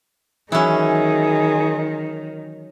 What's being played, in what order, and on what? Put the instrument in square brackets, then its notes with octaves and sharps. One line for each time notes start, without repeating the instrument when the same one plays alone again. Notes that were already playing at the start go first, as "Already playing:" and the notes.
[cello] D#3 [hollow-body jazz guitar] E3 F#3 [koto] C#4 E4 [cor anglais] G#4